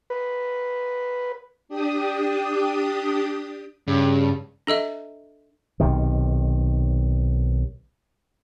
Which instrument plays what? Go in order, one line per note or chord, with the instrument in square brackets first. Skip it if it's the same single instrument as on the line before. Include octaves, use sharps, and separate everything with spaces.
[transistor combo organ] B4
[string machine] D4 G4 D#6
[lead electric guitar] G2 [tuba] C#3
[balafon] D4 A4 D#5 E5
[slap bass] B1 C3 D#3